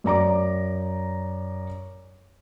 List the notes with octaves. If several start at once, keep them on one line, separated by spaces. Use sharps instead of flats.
F#2 D5 A#5 D6